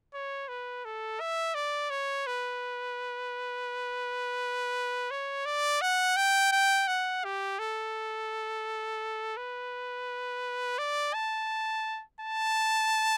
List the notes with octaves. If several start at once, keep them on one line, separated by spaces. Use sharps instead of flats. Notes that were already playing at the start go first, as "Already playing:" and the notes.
C#5
B4
A4
E5
D5
C#5
B4
C#5
D5
F#5
G5
G5
F#5
G4
A4
B4
D5
A5
A5